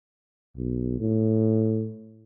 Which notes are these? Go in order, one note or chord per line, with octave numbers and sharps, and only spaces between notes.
B1
A2